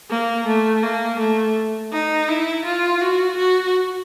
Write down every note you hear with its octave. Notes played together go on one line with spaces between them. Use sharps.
A#3
A3
A#3
A3
D#4
E4
F4
F#4
F#4